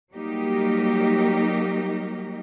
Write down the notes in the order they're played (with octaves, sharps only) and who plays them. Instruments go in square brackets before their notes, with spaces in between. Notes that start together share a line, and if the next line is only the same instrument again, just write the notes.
[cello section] F#3 G3 A#3 D#4 G4 A#4